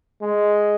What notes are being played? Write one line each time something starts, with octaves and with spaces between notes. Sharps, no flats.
G#3